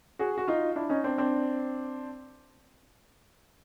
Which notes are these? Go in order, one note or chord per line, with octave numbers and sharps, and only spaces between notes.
F#4 G#4
F#4
D#4 F4
D4 E4
C#4 D#4
C4 D4
C4 D4